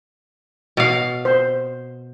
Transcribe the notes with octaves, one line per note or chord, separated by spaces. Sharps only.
B2 F5
C5